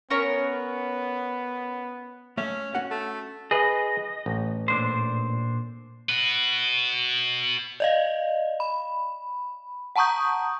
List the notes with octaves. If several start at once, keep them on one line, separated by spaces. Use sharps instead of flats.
B3 C#4 A#4 C#5
A3 C#4 E5
C#4 F#4 F#5
A3
G#4 B4 D#5
A1
A#2 D4 C5
F#4 B4
D5 D#5 F5
B5
F#5 A5 A#5 C#6 D#6 G6